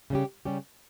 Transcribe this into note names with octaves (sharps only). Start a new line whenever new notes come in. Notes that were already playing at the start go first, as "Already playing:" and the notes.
C#3 G3 C#4 G4
C#3 G3 C#4 G4